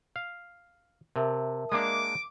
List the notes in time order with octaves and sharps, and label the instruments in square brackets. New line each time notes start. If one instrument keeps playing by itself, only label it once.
[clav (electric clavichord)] F5
[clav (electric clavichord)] C3 [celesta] A#4 E5 A5
[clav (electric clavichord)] G#3 A#3 D4 [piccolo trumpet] D6